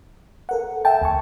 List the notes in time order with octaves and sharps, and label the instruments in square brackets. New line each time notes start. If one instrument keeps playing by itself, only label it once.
[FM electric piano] A4 A#4 F#5
[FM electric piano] E5 G5 [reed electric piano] A5
[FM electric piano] D2 G#5 C#6